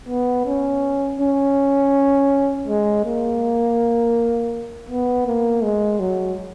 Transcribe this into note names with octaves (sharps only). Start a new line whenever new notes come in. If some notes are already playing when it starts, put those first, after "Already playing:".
B3
C#4
C#4
G#3
A#3
B3
A#3
G#3
F#3